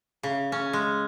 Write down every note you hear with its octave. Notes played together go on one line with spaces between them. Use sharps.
C#3
C#4
G#3